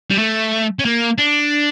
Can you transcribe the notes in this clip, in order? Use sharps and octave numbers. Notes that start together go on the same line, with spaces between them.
G3
A3
C#4
A#3
D4